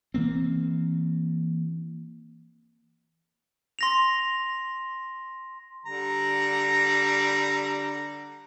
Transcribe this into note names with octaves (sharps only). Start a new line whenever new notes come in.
E3 A#3 C4
C6 A#6 F7
D3 G3 A#5